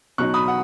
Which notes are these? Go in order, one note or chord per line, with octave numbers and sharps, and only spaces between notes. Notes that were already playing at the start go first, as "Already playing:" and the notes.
B2 F#3 D#4 C#6 F#6
B5 D#6
F#5